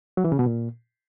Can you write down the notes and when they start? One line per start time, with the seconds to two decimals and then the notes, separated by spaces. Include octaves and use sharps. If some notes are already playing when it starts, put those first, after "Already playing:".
0.17 F#3
0.25 E3
0.32 C#3
0.39 B2
0.46 A#2